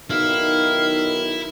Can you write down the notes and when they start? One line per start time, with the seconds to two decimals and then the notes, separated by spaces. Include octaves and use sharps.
0.10 B1 D#3 E4 F5